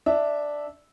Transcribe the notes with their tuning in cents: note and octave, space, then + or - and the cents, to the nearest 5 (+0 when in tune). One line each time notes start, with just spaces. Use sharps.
D4 +0 E5 -10